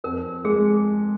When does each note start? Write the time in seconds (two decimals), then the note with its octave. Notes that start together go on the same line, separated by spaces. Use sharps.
0.04 F2 A#4
0.45 G#3 G#4